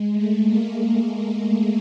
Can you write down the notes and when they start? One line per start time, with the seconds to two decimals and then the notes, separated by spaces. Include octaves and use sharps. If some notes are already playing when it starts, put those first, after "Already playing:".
Already playing: G#3
0.13 A3
0.43 A#3
0.71 A3